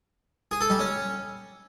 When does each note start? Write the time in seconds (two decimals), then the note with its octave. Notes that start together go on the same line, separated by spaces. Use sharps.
0.51 G#4
0.61 A4
0.70 G3
0.79 C#4